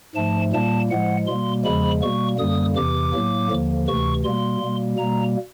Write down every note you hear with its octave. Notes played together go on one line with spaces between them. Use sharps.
G#2 F3 A3 A5
A#2 G3 A#3 A5
A2 F3 G#3 F#5
B2 G3 A#3 C6
E2 C#3 F3 G#3 B5
B2 G3 A#3 C#6
F#2 D3 G3 A#3 D#6
E2 C3 E3 D6
A2 F#3 A#3
D#2 D3 F3 A#3
D2 C3 E3 C#6
B2 G3 A#3 C6
B2 G3 A#3
B2 G3 A#3 A#5